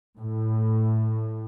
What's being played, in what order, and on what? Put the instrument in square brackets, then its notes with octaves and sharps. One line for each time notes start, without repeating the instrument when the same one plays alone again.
[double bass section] A2